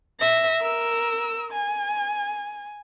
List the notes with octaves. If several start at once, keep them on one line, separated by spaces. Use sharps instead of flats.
E5 A#6
A#4 E6
G#5